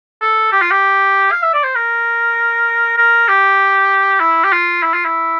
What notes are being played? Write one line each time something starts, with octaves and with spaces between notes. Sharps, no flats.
A4
G4
F4
G4
F5
E5
D5
C5
A#4
A#4
G4
E4
G4
F4
E4
F4
E4